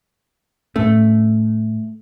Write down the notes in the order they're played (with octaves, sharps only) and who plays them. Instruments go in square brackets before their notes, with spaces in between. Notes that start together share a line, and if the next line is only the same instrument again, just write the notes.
[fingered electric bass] A2 C#4 [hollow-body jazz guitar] A3